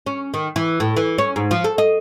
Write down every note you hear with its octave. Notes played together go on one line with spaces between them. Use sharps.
C#4
D#3
E3
A2
E3
C#4
G#2
F3
A4
D#5